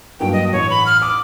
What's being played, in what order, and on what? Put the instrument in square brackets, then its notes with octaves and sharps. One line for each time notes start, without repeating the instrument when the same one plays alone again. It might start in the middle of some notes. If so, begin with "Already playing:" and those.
[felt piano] G2 F#3 A#3 [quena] G5
[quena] D#5
[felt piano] A1 [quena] C#5
[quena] B5
F6
[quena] D6 [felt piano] D#6